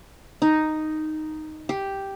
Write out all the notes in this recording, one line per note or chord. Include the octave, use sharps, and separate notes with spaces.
D#4
G4